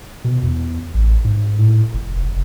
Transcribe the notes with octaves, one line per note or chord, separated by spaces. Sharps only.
B2
E2
A1
G#2
A2
F1
F1